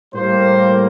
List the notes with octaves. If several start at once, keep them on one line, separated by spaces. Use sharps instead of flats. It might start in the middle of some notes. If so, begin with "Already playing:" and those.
A2 G3 A#3 C5